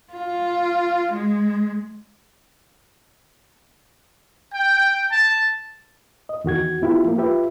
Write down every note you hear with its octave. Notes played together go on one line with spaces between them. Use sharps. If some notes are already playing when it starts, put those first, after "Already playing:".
F4
G#3
G5
A5
D#5
E2 D#3 F#4 G#6
B3 E4 F4 G4
F3 A#3
F4 G4 B4 E5